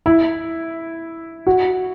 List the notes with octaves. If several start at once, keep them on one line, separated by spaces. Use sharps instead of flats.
E4
F#4